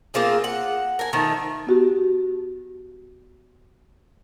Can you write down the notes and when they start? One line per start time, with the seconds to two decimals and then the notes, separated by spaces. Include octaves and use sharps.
0.14 A#3 C4 F4 G#4
0.44 F#5
0.99 A#4 G#5
1.13 D#3 F3 A3
1.67 B3 F#4 G4